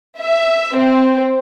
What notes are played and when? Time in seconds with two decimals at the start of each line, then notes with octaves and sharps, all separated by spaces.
0.20 E5
0.77 C4